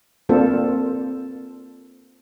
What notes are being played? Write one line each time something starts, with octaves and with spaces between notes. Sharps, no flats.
A#3 C4 D4 F4 A4 C5